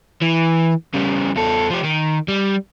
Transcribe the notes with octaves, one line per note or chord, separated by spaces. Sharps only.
E3
C#3 G3
E2 A4
F3 G4
D#3
G3